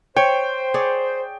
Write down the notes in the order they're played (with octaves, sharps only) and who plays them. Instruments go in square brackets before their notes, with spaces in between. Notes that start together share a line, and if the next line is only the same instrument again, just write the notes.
[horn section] C5 [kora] C#5 [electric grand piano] G5
[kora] G#4 C#5 D5